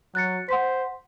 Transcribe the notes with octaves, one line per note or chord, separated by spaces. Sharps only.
F#3 F#6 A6 C#7
C5 F#5 C6 B6